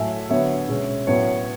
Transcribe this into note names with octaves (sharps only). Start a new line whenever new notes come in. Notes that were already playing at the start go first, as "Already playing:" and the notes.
Already playing: A2 F#3 A3 E5 G#5
D3 F#3 B3 C#5 E5
B2 G#3 C#4
A2 F#3 B3 C#5